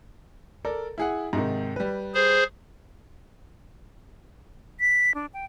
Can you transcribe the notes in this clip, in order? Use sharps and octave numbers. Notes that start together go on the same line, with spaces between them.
A4 A#4 D5
E4 G#4 F#5
G#2 C3 D#3
G3 B4
G#4 C5
B6
D4
G5